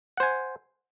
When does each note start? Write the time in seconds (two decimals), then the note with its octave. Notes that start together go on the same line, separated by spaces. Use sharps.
0.17 F#5
0.20 C5
0.23 G#5